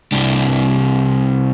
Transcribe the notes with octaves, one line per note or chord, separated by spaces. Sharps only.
C2 D4